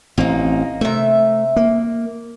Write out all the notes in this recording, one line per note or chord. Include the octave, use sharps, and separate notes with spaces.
A1 A#3 C4 D#4
C3 A3 E5
A#3